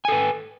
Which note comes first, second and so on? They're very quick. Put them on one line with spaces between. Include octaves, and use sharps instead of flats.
G#5 A4 B4